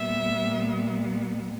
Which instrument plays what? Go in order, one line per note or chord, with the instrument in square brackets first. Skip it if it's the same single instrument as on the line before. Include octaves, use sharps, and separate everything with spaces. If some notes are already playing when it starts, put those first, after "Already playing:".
Already playing: [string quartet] A#2 G3 B3 E5